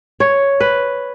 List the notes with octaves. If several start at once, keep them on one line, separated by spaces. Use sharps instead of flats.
C#5
B4